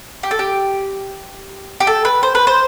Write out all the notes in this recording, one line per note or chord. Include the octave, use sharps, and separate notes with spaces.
G4
A4
G4
G4
A4
B4
C5
B4
C5